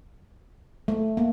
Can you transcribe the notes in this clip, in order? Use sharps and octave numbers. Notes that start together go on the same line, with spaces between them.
A3
A#3